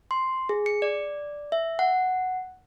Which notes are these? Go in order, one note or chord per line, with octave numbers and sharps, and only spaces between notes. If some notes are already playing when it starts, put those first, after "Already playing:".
C6
G#4
C#7
D5
E5
F#5